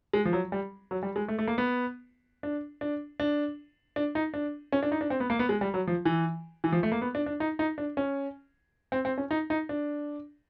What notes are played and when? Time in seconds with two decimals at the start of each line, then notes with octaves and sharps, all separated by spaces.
0.13 G#3
0.25 F3
0.33 F#3
0.52 G3
0.91 F#3
1.03 G3
1.16 G#3
1.28 A3
1.39 A3
1.48 A#3
1.58 B3
2.43 D4
2.81 D4
3.20 D4
3.96 D4
4.15 D#4
4.34 D4
4.72 C#4
4.83 D4
4.92 D#4
5.01 D4
5.10 C4
5.20 B3
5.30 A#3
5.39 B3
5.49 G#3
5.61 G3
5.74 F#3
5.87 F3
6.05 E3
6.64 E3
6.72 F3
6.83 A3
6.92 A#3
7.02 B3
7.15 D4
7.26 D4
7.40 D#4
7.59 D#4
7.78 D4
7.97 C#4
8.92 C4
9.05 C4
9.18 C#4
9.31 D#4
9.50 D#4
9.69 D4